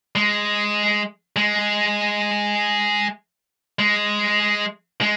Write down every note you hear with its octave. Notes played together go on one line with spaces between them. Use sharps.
G#3
G#3
G#3
G#3